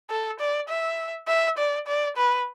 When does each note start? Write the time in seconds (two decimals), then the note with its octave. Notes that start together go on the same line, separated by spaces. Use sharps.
0.10 A4
0.39 D5
0.69 E5
1.28 E5
1.58 D5
1.87 D5
2.17 B4